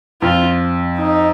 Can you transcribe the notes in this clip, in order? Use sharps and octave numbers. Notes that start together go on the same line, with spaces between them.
F2 F4
D#4